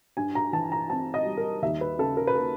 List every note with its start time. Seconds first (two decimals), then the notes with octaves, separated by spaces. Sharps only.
0.17 G2 G#5
0.35 A#5
0.52 E3 A5
0.72 A#5
0.90 C4 A5
1.14 D#5
1.25 G3
1.37 A#4
1.62 D#2 E5
1.81 B4
1.99 C#3 A4
2.17 A#4
2.27 B4
2.35 A#3 A#4